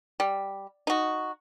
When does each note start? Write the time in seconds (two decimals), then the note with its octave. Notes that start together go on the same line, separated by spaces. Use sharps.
0.20 G3
0.87 D#4 F#4